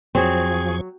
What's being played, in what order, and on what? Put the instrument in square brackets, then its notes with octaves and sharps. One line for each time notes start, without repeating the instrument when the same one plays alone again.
[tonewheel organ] F2 F3 C#6 [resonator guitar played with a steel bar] F#3 [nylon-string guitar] C4 [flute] G#4